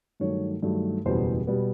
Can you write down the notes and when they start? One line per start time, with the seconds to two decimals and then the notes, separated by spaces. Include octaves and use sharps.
0.20 G2 D#3 F#3 A3 C#5
0.63 G2 D#3 F#3 A3
1.05 F#1 E2 B2 G3 B3 C5
1.47 B2 G3 B3